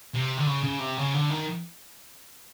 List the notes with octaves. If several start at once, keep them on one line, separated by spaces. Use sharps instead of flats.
C3
D3
C#3
C#3
C3
C#3
D3
D#3